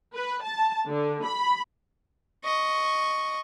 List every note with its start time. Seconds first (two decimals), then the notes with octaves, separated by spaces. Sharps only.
0.15 B4
0.44 A5
0.87 D3
1.24 B5
2.44 D#5 C#6